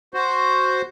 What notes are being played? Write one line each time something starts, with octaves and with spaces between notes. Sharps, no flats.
F#4 C5